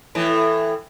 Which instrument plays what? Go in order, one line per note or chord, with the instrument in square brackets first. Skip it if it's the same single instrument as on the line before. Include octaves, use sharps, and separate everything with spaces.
[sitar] A2 E3